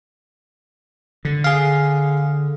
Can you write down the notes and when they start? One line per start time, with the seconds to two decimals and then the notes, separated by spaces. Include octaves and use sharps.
1.25 D3
1.44 G#4 F5